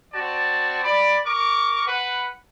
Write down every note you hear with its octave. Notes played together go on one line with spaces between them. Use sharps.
C4 F#4 D5 A5
D5 B5
A#4 C#6 D6
B4 F#5